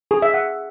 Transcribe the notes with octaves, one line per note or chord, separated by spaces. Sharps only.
G#4
E5
F#5